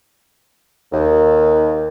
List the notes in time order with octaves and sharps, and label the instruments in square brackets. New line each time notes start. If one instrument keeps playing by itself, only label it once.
[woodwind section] D#2